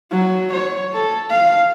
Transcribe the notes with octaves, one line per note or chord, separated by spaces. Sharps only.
F#3
C#5
A4
F5